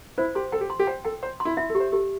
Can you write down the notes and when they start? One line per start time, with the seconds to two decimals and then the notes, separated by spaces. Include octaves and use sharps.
0.18 E4 C5
0.35 G4 C6
0.52 A4 G5
0.61 G4
0.70 C6
0.79 G4
0.87 C5 G5
1.05 A4 G5
1.23 C5 C6
1.40 C6
1.45 E4
1.57 E4 E5
1.70 A4
1.75 G4
1.80 C5
1.92 G4 A4